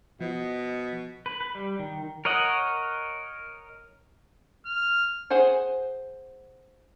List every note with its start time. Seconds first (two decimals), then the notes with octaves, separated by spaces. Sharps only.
0.20 B2 F3 D#5
1.26 B4
1.41 B4
1.55 G3
1.79 D#3
2.25 A#4 C#5 D#5 F#5
4.66 F6
5.30 G#4 C5 F#5 G#5